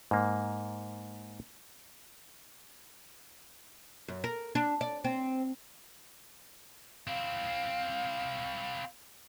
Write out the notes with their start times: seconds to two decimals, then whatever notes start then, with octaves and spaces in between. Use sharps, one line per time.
0.11 G#2 A#3
4.08 F#2
4.24 A#4
4.55 D4
4.81 D5
5.04 C4
7.07 C4 E4 F5